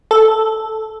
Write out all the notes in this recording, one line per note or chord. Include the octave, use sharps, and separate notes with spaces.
A4